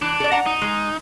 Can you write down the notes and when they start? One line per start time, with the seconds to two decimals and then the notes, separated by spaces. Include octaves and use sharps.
0.02 E3 D4
0.20 A4 D5
0.32 F#5 A#5
0.46 D#4
0.62 G#3